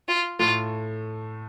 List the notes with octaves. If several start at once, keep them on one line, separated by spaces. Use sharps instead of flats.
F4
A2 A3 F4